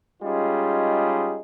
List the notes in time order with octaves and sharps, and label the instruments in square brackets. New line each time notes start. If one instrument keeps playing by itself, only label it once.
[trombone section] G3 G#3 C#4 D#4 F4 G#4